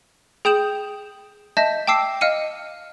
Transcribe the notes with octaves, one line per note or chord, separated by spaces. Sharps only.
G#4 G5 D#6 G6 E7 F#7
D#5 E5 A5 G6 A#6 B6
G5 A5 D6 E6 C7
D#5 F5 F6 C#7 D#7